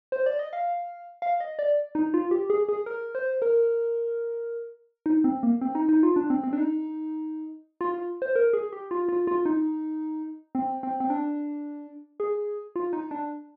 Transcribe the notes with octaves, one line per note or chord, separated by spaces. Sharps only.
C5
D5
D#5
F5
F5
D#5
D5
D#4
F4
G4
G#4
G#4
A#4
C5
A#4
D#4
C4
A#3
C4
D#4
D#4
F4
D4
C4
C4
D4
D#4
F4
F4
C5
A#4
G#4
G4
F4
F4
F4
D#4
C4
C4
C4
D4
G#4
F4
D#4
D4